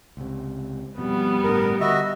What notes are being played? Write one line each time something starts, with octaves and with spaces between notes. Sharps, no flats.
C#2 C3
F2 B2 G3 B3
G1 A2 D4 A#4
D3 F#4 D#5 E5